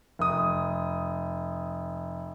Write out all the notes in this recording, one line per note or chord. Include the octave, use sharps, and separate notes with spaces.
F1 D#6